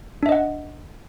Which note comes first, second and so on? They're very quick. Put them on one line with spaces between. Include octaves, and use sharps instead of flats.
D4 E5 D#5 F#5